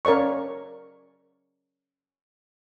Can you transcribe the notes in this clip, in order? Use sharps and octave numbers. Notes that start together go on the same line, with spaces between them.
C#4 A#4 C#5 D5 C#6